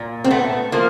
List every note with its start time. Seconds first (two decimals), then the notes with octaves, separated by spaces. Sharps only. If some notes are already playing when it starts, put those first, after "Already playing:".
Already playing: A#2
0.24 C4
0.31 A3 B3
0.72 F3 A#3